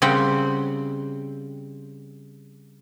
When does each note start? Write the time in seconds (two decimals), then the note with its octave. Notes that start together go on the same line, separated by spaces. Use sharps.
0.02 C#3 G3 C4 F#5 G5